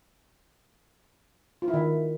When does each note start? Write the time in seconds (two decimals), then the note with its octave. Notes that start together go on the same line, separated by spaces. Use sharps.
1.62 F4
1.68 E4
1.74 D#3